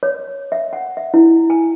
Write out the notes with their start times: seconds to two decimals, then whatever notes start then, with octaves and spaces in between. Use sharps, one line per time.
0.03 C#5
0.52 E5
0.73 F#5
0.97 E5
1.14 E4
1.50 G#5